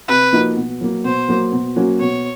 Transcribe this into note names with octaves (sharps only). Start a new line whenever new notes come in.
C3 B4
F3 A#3 D#4 F#4
B2
F#3 A#3
B2 C5
F#3 A#3
B2
F#3 A#3 C#4 F#4
B2 C#5